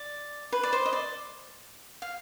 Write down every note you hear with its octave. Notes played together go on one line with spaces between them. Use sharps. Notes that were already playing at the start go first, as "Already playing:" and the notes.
Already playing: D5
B4
D5
C5
D#5
D5
F5